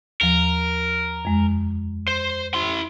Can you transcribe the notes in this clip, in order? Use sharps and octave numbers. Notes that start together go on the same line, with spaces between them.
D#2 F3 A#4
F2 G#3
C5
E4 C6